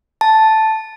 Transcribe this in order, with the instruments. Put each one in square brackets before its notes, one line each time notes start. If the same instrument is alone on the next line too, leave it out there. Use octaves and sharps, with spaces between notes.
[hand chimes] A5